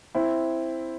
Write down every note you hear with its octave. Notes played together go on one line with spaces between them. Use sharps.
C4 E4